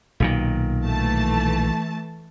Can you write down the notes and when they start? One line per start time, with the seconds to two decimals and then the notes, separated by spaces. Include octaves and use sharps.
0.20 B1 A#2 D#3
0.82 E3 A3 A5